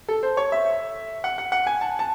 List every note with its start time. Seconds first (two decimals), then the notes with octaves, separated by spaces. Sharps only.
0.08 A4
0.23 C5
0.37 C#5
0.52 E5
1.24 F#5
1.38 F#5
1.52 F#5
1.67 G#5
1.81 A5
1.99 A5